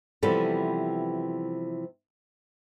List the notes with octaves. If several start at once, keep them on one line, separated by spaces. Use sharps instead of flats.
C3 E3 F3 G3 B3 A4